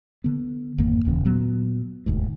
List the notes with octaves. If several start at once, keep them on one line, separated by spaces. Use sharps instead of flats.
D3 B3
G#1 F2 D#3 A#3
D#1 D#2 C#3 E3
A#2 F#3 B3
E1 D2 G#2